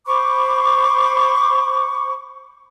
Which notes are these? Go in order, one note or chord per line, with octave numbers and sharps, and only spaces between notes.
C5 B5 C#6 D6